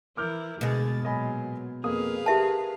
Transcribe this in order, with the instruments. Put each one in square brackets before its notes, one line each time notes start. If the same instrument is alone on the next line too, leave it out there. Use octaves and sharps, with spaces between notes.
[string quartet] E3 E4 A#4 [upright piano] D6 F6 G6
[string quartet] D2 G#4 A6 [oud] B2 G#3
[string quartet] A#2 F#3 [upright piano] D#5 G#5 B5
[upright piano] F2 A#3 D#6 [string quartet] G#4 B4 F5
[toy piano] G4 E5 A5 [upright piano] A#4